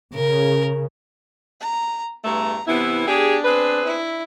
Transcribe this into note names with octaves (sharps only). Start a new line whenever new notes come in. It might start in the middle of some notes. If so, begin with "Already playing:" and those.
C#3 A#4
A#5
E2 G2 A3 A#5
C3 E3 B3 E4
D4 G4 G#4
C4 G#4 B4
E4